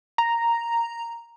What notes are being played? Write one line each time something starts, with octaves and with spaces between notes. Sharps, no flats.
A#5